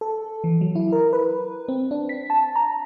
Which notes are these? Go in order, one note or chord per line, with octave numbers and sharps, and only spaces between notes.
A4
E3
F#3
E4
A#4
B4
C4
D4
B6
A5
A#5